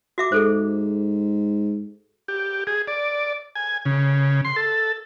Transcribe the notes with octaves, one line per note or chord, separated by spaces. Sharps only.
F#4 E5 D6
G#2 G#4 A4 C5
G4
G#4
D5
G#5
C#3
C6
A4